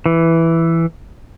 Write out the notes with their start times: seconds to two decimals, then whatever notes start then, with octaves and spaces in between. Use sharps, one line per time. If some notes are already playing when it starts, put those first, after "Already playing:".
0.06 E3